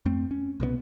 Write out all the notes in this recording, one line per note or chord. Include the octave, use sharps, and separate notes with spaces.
F2 A3 C4
C#4
C2 B2 G#3 B3